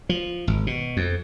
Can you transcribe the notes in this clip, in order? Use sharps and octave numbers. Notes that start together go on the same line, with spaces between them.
F3
G#1
B2
F2